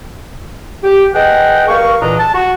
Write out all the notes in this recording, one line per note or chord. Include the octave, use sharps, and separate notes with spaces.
G4
G#4 B4 D#5 F#5 G5
G2 A#4 F5 C#6
E2 A#2 E3 D4 D#5 A#5
A5
F#4